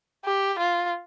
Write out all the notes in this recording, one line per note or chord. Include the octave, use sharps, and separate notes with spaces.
G4
F4